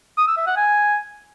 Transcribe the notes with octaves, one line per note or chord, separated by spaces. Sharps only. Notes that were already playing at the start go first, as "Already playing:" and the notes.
D#6
E6
E5
F#5
G#5